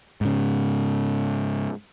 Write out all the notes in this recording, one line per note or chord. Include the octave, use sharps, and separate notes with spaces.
G#2 C#3